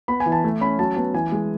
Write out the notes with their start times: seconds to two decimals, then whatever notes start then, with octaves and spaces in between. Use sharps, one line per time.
0.08 B3 B5
0.20 G#5
0.26 E3
0.32 A5
0.44 A3
0.61 C#4 B5
0.79 F#3 A5
0.96 B3 A5
1.14 E3 G#5
1.32 G#3